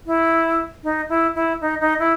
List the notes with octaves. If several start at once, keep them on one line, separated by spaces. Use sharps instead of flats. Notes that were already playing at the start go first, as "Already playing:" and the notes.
E4
D#4
E4
E4
D#4
D#4
E4